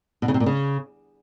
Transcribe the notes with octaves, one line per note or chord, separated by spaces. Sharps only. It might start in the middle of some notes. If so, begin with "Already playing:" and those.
B2
C#3
C3
A#2
C#3